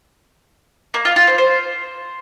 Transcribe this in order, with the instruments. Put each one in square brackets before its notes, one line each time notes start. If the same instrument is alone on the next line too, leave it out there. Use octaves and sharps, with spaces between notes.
[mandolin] A#3
F4
F4
C5
C5